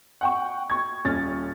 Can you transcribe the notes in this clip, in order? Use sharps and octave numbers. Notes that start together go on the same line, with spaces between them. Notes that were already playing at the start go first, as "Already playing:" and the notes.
F#5 G5 C#6
C#6 G#6
D#1 C#4 F6 A6